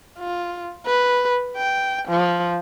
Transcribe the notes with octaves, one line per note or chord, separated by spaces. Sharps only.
F4
B4
G5
F3